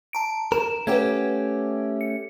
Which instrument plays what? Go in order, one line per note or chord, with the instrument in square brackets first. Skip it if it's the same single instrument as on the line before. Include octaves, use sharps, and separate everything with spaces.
[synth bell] A5 A#5 D7
[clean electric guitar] A#4 [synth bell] E7
[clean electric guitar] A3 C#4 G4 [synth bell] B4 F#5 G#6
[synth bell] C#7